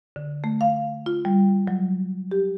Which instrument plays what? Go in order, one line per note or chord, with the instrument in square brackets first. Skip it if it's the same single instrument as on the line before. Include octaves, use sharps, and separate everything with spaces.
[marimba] D3
A3
F5
F4
G3
F#3
G4